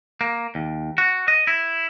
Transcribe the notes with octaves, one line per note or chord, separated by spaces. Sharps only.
A#3
D#2
F#4
D#5
E4